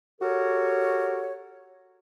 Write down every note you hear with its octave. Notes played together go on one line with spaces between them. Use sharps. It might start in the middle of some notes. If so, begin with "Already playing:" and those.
F#4 G4 A4 A#4 C#5